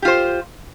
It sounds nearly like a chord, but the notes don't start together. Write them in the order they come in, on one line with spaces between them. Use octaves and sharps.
G4 F4 C5